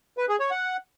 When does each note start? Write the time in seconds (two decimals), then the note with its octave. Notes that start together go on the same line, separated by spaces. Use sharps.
0.18 B4
0.29 G#4
0.40 C#5
0.51 F#5